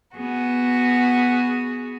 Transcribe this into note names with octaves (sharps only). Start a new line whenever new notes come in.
B3 F#4 G#4